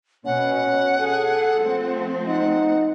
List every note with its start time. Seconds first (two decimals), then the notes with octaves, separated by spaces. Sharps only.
0.25 B2 C#4 F#5
0.99 G#4 A4
1.61 F3 A3 C4
2.27 D#4 F#5